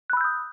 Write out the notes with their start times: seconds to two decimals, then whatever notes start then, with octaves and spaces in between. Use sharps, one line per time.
0.10 F#6
0.13 B5
0.17 E6
0.21 G6
0.24 D#6